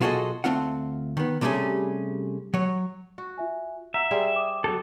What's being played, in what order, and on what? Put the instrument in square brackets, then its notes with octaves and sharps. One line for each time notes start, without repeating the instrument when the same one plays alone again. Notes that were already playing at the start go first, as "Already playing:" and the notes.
[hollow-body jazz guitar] B1 F4 F#4 G#4 A4 D#5
D2 C3 A3 C4 F4 F#5
D#3 B3
C3 G3 A3 B3 C#4 G#4
F#3 C#5
[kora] F#4
[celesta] F4 E5 G#5
[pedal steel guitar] E5 [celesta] F#5 A#5 B6
[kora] G3 G#4 C5
[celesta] D6 D#6
[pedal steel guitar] F#3 A4